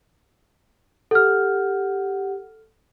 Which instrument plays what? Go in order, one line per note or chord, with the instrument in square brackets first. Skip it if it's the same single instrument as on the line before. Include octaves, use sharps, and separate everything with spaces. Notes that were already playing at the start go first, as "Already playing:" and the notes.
[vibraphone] G4 F#5 [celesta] A4 F6